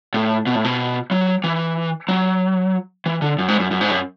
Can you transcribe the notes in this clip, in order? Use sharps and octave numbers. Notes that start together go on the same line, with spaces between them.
A2
B2
A2
B2
F#3
E3
F#3
E3
D3
F#2
G#2
F#2
F#2
G#2
F#2